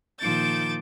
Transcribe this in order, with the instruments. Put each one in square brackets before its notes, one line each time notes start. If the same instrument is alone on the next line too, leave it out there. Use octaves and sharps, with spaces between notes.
[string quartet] A#2 D#3 F3 D6 G6 A6